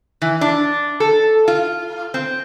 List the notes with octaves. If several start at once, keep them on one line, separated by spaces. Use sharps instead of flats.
E3
D4
A4
F4
C4